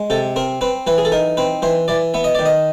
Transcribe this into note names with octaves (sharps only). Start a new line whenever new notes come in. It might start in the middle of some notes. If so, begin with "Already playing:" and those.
Already playing: G#3
C3 A4
C4 A#4
C4 B4
E3 B4
G#4
A4
D#4 A#4
C4 B4
E3 C5
E3 D5
B3 E5
D#5
D#3 D5
D#5